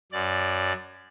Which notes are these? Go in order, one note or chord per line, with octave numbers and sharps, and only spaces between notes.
F#2 D5